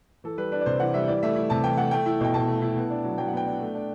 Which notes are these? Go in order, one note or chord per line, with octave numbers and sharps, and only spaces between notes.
E3 A4
G3 B4
D4 B4
D5
C3 C5
E3 F#5
G3 E5
E3 D5
A3 E5
E4
C3 A5
E3 G5
A3 F#5
A3 G5
E4
B2 G5
B2 A5
A3
E4
B3
D4
F#3
F#3 G5
F#5
B3 G5
D4
A3
D4